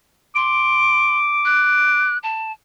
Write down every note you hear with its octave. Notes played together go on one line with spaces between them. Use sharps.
C6 D6
F#6
A5